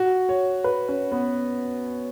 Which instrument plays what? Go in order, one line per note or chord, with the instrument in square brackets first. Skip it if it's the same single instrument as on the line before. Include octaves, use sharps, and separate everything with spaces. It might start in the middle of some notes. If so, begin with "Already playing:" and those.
Already playing: [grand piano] F#4
C#5
B4
C#4
B3